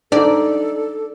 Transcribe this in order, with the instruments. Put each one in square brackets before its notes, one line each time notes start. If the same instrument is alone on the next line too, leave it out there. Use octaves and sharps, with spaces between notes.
[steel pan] D4 D#4 [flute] A4 [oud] D5